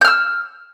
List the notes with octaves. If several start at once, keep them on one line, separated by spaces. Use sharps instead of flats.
E6 F6 G6